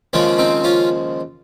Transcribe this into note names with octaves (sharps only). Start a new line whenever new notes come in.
D#2 C#3 F3 G#3 C#4
C4 D#4
C#4 F4